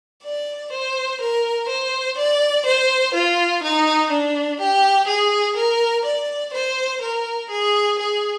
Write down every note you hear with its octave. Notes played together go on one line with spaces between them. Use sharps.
D5
C5
A#4
C5
D5
C5
F4
D#4
D4
G4
G#4
A#4
D5
C5
A#4
G#4
G#4